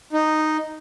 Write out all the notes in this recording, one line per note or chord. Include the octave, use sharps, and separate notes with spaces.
D#4